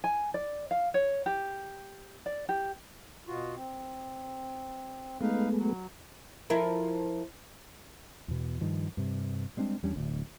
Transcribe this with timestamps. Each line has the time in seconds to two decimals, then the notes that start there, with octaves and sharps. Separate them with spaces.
0.04 G#5
0.34 D5
0.71 F5
0.94 C#5
1.26 G4
2.26 D5
2.49 G4
3.27 B2 F4 F#4
3.56 C4
5.21 G#3 A3 B3 D#4 B4 F5
5.56 F#3
6.50 F3 E4 A#4
8.28 E2 B2
8.61 G2 D#3 F3
8.97 G2 C3
9.57 G3 G#3 C4 D4
9.83 E2 G3 C#4 D4
9.96 D1 D2